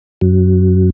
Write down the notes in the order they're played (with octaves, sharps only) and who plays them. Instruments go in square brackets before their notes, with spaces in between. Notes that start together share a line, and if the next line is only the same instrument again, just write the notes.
[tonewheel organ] F#2